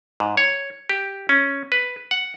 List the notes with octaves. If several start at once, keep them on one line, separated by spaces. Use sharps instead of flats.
G#2
C#5
G4
C#4
B4
F#5